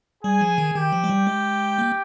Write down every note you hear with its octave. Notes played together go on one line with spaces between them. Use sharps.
G3 G#4 G#5
F3
D#3
D#3 G4 G5
F3
G#3
G3
G#3
A#3